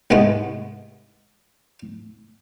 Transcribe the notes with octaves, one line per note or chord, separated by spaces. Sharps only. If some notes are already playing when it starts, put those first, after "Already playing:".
C2 G#2 G#3 A3 B3